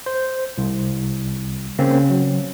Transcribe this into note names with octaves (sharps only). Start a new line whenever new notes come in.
C5
C2
C#3 A#3 C4 C#4
F#3